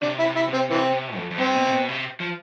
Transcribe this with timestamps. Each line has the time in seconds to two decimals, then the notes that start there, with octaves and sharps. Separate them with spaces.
0.02 C3 D4
0.19 E4
0.25 C3
0.36 E4
0.48 C3
0.54 C4
0.70 C3 E3 C4
0.93 C3
1.16 F2
1.31 F2
1.38 G2 C4
1.55 B2
1.67 C3
1.72 B2
1.89 C3
2.20 F3